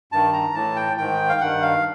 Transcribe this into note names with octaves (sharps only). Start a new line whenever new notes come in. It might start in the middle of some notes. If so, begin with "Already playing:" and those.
G2 D#3 A5
A#5
A2 E3 A5
G5
G#2 D#3 G5
F5
G2 D#3 F#5
F5